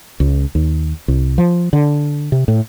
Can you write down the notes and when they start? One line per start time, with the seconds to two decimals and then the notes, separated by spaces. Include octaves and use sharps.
0.20 C#2
0.55 D#2
1.08 C2
1.38 F3
1.73 D3
2.32 C3
2.48 A2